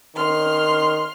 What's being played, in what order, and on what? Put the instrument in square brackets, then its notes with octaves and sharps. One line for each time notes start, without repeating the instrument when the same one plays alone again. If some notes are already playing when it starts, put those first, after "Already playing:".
[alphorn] D#3 [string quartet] C6 F6